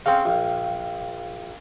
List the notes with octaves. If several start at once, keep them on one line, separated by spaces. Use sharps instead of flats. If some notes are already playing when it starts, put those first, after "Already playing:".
C#3 C4 F5 G5
A#1